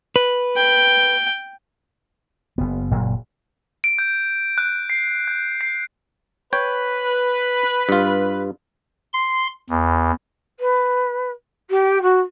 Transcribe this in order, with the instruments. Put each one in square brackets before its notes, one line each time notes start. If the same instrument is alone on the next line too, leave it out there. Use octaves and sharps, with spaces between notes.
[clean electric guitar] B4
[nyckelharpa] G5
[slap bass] F#1 B3
F#1 A#2 F#3
[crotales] D7
G6
F#6
C7
G6
C7
[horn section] B4 [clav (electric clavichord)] C#5 G5
[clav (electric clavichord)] G2 F4
[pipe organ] C6
E2
[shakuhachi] B4
G4
F#4